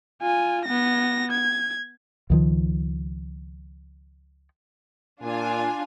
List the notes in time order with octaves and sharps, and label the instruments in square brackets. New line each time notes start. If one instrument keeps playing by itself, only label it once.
[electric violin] F4 G#5
B3 A#6
G#6
[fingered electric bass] C#2 D#3 F3
[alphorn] A#2 [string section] D4 F4 G#5